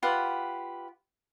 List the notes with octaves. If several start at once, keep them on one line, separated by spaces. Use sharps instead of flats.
F4 G4 B4 F#5